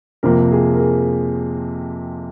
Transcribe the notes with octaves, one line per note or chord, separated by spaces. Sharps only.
F2 C3 F3 A#3 A#4
G#4
A#4
G#4